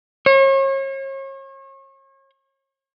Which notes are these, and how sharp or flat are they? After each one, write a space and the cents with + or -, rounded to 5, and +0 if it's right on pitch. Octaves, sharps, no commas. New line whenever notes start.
C#5 -40